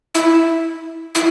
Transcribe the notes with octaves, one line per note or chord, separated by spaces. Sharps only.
E4
E4